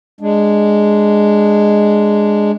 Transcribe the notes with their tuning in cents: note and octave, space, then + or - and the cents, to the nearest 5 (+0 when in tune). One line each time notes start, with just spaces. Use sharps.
G#3 +0 D4 +5